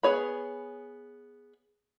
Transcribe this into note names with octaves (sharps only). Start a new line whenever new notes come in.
B3 G#4 C#5 B5